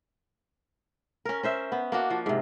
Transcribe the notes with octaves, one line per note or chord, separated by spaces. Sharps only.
C#4 A#4
C#4 C5 E5
B3
A#3 D4 F#4
F3
G#2 C3